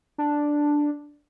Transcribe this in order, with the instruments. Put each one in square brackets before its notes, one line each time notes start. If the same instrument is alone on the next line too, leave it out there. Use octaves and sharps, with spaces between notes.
[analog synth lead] D4